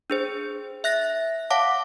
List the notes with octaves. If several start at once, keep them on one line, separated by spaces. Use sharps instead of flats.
D4 G#4 C5
E5 F#6 A#6
C#5 F5 F#5 A5 D6